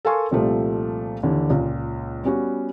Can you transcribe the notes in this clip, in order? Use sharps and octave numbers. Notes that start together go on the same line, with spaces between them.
A4 A#4 F5 G#5 C6 C#6
C2 A#2 F3 G3 A3 C4
D#2 D3 E3
C#2 A#2
G3 B3 C#4 F#4